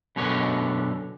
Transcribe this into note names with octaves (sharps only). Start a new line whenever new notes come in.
F#2 B2 D3 C#5